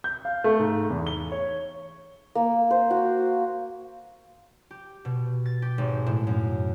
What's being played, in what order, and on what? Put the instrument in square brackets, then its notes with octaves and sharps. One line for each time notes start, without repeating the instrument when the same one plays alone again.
[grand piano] G6
F5
A3
G#2
E2
G7
C#5
[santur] A#3
C5
F#4
[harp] G4
B2
A6
G4
G#1
A2
F#2